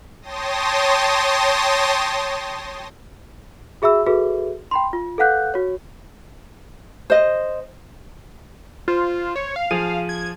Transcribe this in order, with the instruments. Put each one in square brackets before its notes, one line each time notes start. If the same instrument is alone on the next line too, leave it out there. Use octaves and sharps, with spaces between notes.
[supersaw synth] C#5 G5 A5 C6 D#6 A#6
[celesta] F#4 G#4 E5 B5 E6
F#4 G#4 A4 B4 E5
G5 B5 C6
F4
A4 B4 F5 F#5 F#6 G6
F#4 C#5
[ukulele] C5 D#5
[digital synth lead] F4 [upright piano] C5
[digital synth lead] C#5
F5
[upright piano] F3 G#4 D#7
[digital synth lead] G#6